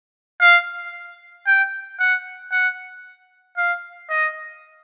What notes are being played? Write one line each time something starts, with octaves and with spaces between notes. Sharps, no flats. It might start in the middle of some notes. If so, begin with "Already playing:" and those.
F5
G5
F#5
F#5
F5
D#5